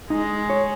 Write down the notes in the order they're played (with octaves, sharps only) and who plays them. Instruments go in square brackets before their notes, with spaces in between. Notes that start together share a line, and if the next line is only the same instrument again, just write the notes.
[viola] G#3 [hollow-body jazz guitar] D#4
[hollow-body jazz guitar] C#5